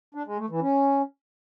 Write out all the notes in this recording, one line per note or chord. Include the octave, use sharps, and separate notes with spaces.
D4
G#3
A3
E3
C#4